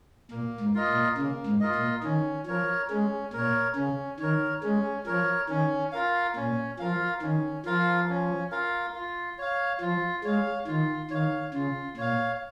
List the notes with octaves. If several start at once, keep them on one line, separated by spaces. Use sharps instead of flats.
A#2 A#3
G#2
F4 A#4 D#5
A#2
C#3 A#3
G#2
F4 A#4 D#5
A#2
D#3 C#4
F3 A#4 C#5
G#3 C#4
A#2 A#4 C#5
C#3 C#4
D#3 A#4 C#5
G#3 C#4
F3 A#4 C#5
D#3 C#4
F4 A#4 F5
A#2 C#4
F3 F4 A#4 F5
D#3 C#4
F3 F4 A#4 F5
C#4
F4 A#4 F5
F4
C#5 F5
F3 F4
G#3 C#5 F5
D#3 F4
D#3 C#5 F5
C#3 F4
A#2 C#5 F5